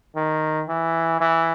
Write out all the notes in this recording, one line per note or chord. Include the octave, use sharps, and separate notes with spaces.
D#3
E3
E3